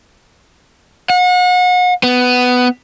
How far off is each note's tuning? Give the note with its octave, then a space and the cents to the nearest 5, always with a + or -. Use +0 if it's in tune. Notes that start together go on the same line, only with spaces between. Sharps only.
F#5 -35
B3 +10